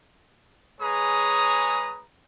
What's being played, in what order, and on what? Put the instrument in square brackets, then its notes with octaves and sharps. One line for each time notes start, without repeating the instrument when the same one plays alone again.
[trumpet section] G#3 G#4 B4 C#5 A#5 D#6